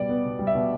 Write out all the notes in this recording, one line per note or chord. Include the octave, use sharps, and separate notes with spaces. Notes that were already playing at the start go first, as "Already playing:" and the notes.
Already playing: B2 G3 D5
B3
B2
G3
E5
B2